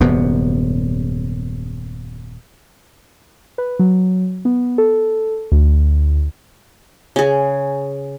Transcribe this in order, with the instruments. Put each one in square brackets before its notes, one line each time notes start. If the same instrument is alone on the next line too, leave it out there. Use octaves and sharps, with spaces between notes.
[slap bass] D#1 F#2 C3 B3
[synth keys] B4
F#3
B3
A4
D2
[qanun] C#3 G#4